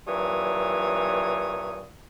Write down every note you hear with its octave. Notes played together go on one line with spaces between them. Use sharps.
G2 A#2 E3 F#3 C#5 D#6